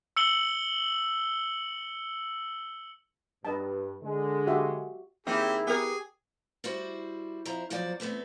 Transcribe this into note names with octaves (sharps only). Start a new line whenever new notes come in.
E6 C#7 F#7 G7
G2 B4 D#5 A5
D3 G#3
F#4 G4 E5
D#3 A#3 C4 E4 G4 G#4
B3 G4 G#4 A#4
G3 E4 F#4 C5
F2 E4 C5 A#5
E2 F3 F#3 C5 D5 F#5
E2 A3 B3 C4